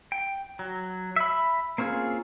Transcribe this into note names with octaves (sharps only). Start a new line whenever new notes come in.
G5
F#3
E5 B5
A#3 C4 C#4 F4 G#4